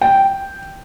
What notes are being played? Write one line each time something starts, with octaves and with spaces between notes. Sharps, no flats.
G5